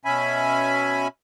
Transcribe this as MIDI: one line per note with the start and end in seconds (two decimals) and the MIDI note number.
0.05 1.08 47
0.05 1.08 61
0.05 1.08 76
0.05 1.08 80
0.05 1.08 83